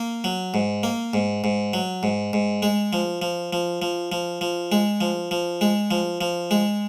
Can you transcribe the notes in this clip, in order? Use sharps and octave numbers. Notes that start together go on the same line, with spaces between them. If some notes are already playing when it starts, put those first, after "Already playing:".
Already playing: A#3
F#3
G#2
A#3
G#2
G#2
F#3
G#2
G#2
G#3
F3
F3
F3
F3
F3
F3
G#3
F3
F3
G#3
F3
F3
G#3